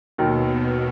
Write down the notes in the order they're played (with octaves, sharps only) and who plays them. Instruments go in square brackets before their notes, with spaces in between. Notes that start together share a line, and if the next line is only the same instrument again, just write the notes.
[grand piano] D#2 D#3 F#3 [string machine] B2